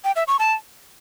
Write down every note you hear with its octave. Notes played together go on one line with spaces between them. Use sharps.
G5
E5
C#6
A5